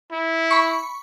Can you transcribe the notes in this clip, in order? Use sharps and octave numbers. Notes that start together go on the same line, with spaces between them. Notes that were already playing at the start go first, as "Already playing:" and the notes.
E4
B5 C#6